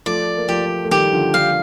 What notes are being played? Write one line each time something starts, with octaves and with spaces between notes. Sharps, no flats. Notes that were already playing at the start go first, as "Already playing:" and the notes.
F3 A3 D5
A#3
F3 A3 G4
A3
D#3 G3 G4
D3 F3
D3 F3 F5